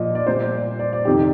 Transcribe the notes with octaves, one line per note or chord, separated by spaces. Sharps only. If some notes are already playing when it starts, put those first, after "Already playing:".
Already playing: A#2 F3 D#5
D5
A#2 G3 C5
D5
D5
F2 C3 D#3 G4